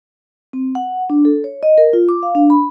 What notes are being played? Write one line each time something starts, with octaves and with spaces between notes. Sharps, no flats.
C4
F#5
D4
A4
C#5
D#5
A#4
F4
D6
F5
D4
B5